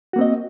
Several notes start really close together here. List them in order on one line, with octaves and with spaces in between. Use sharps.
F#4 A#3 C4 D#5